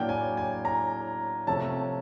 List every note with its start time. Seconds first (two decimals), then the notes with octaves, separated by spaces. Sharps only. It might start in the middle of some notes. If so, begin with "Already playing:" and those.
Already playing: A2 F#3 A#3 D4 G5
0.09 G#5
0.37 G#5
0.65 A#5
1.47 C3 F3 A3 C#4 A5